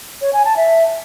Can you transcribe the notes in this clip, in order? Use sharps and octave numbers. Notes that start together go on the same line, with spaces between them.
C#5
G#5
A5
E5